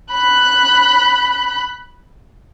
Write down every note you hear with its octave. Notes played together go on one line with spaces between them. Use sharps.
B5 F#6